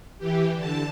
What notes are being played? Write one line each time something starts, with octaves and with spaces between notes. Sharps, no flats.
E3 G4
D3 A5